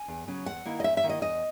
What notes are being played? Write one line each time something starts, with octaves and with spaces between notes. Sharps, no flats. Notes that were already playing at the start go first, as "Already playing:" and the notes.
Already playing: G#5
E2
C#3 F#3 C#4
E2 F#5
D#3 A#3 E4
D#5
E2 E5
E5
D#3 A#3 E4
D#5
E2 D#5